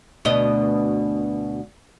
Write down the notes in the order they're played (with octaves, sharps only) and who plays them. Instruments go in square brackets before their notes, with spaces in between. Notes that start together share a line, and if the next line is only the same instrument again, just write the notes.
[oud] D2 B2 D#5